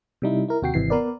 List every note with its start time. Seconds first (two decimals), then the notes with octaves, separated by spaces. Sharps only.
0.22 C3 G3 D#4 E4
0.48 E4 A#4
0.62 D#2 C3 F#4 G5 C7
0.74 G#1 C3 E3 C7
0.90 B3 A#4 B4 D5